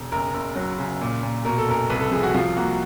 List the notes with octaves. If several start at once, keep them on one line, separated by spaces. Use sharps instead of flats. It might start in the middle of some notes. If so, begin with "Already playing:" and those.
Already playing: E1
F#1 A#4
F#1
F#3
C#3
A#2
A#2
B2 A#4
A4
F#1 A#4
C2 B4
A4
F3 G#4
F#4
F3 F4
A#3 F#4